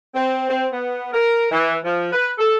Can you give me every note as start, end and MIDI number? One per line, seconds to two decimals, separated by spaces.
0.14 0.45 60
0.48 0.65 60
0.72 1.09 59
1.13 1.46 70
1.50 1.75 52
1.84 2.10 53
2.12 2.30 71
2.38 2.57 69